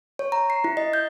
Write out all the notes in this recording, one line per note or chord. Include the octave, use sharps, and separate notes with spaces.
C#5
A#5
C7
E4
D#5
G6